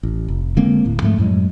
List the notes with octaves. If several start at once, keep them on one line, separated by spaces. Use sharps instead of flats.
A1
F1
D3 G#3 A#3 C4
D1 A2
G#2 F3 G#3 A3
F#2 A2 F#3 G#3